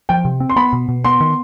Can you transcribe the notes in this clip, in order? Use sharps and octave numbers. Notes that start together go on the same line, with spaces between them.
F3 G5
C3
C4
C6
B3 B5
B2
B2
B3 C6
D#3